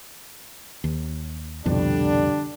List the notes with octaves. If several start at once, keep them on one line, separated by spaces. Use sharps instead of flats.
D#2
C2 F2 B2 D3 G3 D4